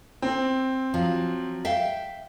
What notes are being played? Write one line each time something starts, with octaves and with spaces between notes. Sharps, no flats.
C4
F3 F#3
E5 F5 G5